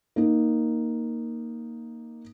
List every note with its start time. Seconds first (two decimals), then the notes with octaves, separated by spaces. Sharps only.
0.16 A#3 D#4